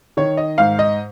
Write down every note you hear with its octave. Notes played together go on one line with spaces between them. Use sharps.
D#3 C#5
D#5
G#2 F5
D#5